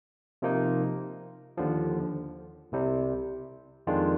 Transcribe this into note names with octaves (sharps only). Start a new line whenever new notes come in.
C3 F3 A#3 D#4
D#2 D3 F3
C2 C3 G3
F2 D#3 G#3 D4 F4